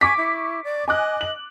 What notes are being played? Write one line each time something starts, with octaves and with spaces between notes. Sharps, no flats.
G#5 C#6 D6 B6
E4
D5
D#5 G#5 D6 F#6
F#7